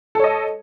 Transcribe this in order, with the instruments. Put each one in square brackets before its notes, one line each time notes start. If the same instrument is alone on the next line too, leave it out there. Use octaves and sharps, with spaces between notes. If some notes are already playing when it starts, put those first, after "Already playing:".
[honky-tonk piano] A4
C#5
D#5